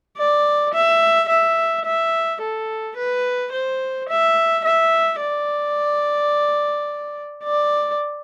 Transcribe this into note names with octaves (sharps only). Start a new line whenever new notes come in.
D5
E5
E5
E5
A4
B4
C5
E5
E5
D5
D5